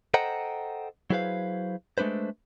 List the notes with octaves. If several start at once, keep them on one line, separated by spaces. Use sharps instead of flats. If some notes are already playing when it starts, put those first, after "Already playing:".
A4 C5 D#5 F#5 G5 A#5
F#3 E4 G#4 B4 C5 F5
G#3 A3 D4 B4 C5